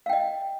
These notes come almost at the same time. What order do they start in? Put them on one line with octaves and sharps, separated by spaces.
F5 G5 D#5